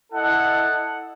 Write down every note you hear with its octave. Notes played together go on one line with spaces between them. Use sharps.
E4 A4 D#5 F#5